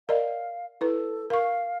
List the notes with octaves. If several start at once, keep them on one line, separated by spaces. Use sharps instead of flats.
A#4 D5 D#5 F5
E4 A4 B4
A#4 F5 C#6